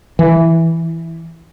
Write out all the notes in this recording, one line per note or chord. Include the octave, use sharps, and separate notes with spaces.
E3